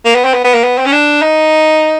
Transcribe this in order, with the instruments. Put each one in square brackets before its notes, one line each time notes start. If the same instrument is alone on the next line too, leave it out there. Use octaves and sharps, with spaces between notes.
[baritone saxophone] A#3
B3
C4
B3
B3
A#3
B3
C4
C#4
D4
D#4